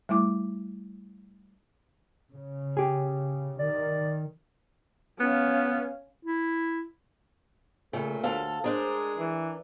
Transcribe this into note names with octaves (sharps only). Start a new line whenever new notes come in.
G3 A3 E4 D6
C#3
G4 G#4
D#3 D5
B3 C#4 F5
E4
A#2 C#3 A3
D2 A4 F5
G#3 D4 G#4 A#4 C5
E3